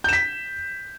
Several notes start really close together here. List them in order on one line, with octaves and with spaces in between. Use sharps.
G6 E7 B6